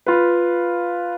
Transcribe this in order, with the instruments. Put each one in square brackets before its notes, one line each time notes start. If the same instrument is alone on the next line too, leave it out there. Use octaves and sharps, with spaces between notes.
[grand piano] F4 B4